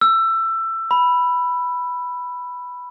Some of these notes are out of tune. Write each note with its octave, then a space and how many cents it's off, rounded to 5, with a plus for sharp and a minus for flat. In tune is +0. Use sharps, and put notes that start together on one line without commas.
E6 +20
B5 +0